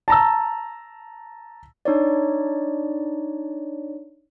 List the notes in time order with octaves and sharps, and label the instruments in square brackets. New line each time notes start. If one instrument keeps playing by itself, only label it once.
[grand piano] A5 A#5 E6
[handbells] D4 D#4 C#5 D5